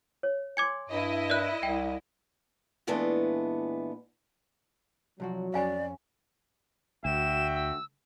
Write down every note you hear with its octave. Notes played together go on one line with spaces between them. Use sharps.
C#5
G#5 C6 D6 G#6 C#7
G2 E4 D#5
A#4 D5 E5 F#6
C2 G5
A#2 E3 G#3 A3 B3 D4
C2 F3 F#3 F#4
F2 C#4 D5 F5 G#5 B5
D2 F#4 E5 G5 E7
E6